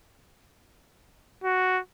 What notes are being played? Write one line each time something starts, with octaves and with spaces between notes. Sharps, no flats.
F#4